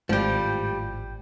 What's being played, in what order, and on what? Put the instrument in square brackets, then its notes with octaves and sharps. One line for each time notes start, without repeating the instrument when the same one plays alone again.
[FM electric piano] G#1 A2 G5 [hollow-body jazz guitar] F3 G3